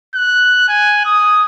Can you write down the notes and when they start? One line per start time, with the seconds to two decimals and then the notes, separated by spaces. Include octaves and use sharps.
0.15 F#6
0.69 G#5
1.06 D#6